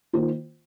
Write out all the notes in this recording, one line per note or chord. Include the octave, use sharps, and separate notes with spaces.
D#3 A#3 F4 C5